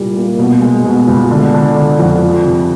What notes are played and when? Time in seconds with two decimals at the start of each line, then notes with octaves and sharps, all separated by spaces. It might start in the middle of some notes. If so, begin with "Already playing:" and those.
Already playing: C2 A#2 G3
0.16 A#3
0.39 B2
0.62 G#3
0.85 B2
1.08 C#2
1.31 D3
1.54 D3
1.76 D3
1.99 F2
2.22 F3
2.46 C3